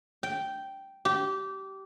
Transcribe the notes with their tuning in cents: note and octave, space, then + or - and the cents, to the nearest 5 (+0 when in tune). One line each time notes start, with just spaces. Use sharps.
G5 -5
G4 -20